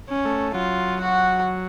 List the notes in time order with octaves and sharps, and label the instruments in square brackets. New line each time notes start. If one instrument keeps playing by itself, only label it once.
[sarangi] C#4
[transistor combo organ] A3
[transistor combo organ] F#3 [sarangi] F4
[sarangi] F#4